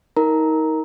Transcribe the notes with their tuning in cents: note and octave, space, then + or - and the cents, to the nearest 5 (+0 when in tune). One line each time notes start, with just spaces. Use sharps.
D#4 +30 A#4 +0 A#5 +0